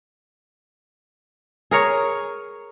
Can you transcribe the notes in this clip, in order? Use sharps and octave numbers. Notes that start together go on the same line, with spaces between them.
G#4 A#4 C#5